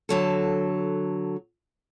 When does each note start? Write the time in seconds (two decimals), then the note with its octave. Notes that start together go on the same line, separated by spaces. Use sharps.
0.09 D3 F#3 A4